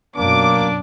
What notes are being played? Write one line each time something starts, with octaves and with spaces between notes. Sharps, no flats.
F#2 B2 F#3 A#3 D4 D6